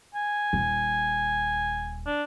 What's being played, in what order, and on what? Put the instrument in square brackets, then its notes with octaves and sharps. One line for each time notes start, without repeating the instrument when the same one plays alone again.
[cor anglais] G#5
[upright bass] D#1
[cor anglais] D4